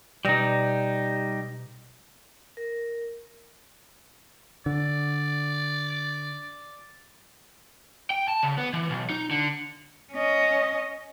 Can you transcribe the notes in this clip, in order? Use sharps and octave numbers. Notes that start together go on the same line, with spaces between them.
B2 G3 D#4 D5 A#6
A#4
D3 D5
G5
A5
C#3
B3
E3
B1
D#4
D3
C#4 D#5